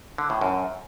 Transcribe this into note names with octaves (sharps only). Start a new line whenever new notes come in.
D3
A2
F#2